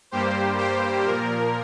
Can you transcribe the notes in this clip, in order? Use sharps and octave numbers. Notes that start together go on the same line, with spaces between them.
G2 G3 A#3 G4 C5
G4 C5
A#2 F3 A#3 A#4